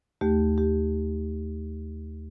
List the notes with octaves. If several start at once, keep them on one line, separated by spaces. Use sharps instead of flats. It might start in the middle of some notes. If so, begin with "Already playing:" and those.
D#2 A3 G4
G4